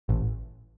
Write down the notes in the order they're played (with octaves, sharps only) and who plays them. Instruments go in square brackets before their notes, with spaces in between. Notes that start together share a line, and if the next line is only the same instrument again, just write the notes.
[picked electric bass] A1